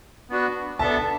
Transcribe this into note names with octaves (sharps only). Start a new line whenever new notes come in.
B3 D4 F#4 B4
B3 D4 A4 E5 A5